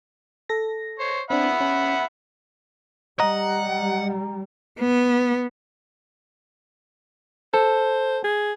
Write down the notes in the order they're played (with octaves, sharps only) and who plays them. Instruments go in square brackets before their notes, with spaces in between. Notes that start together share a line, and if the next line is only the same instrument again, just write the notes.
[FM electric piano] A4 A#6
[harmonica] C5 C#5
[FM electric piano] C4 D4 [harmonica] E5 F#5 B5
[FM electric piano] C#4
[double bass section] G3 [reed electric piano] D#5 [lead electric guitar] F#5 [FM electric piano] A#5
[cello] B3
[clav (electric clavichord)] A4 [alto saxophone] C5
[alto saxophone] G#4